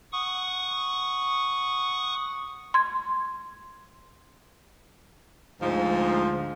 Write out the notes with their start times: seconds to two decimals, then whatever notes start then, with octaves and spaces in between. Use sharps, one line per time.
0.12 F#5 C#6 D#6
2.74 C6 G#6
5.61 D2 G#2 F3